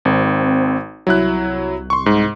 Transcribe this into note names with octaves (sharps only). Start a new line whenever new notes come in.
G#1 C4
C2 F#3 E4 F#6
C6 C#6
G#2